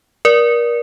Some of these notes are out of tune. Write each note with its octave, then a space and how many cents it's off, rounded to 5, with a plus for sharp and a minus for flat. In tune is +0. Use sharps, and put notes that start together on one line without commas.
A#4 +30 D5 +0